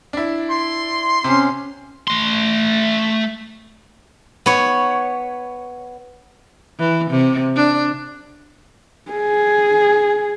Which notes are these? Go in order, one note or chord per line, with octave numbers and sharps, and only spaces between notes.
D4 E4
C6
C3 C#4
A3 C6
B3 C#5
E3
C3
D4
G#4